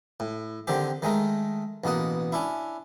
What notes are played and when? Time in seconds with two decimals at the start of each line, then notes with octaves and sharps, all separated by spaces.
0.20 A2
0.67 D3 D#3 C4 G4
1.02 D#3 G#3 A3 A#4
1.84 A1 B2 A#3 D#5 F#5
2.32 C#4 D4 E4